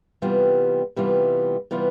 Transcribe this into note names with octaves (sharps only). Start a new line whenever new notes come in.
C3 E3 G3 B3 F4
C3 E3 G3 B3 F4
C3 E3 G3 B3 F4